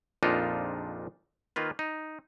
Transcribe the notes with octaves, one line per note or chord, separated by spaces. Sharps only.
A#1 F2 A#2 D4 D#4 F4
D#3 A#3 F4 B4
D#4